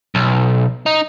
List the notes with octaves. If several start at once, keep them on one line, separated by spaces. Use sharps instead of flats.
B1
D#4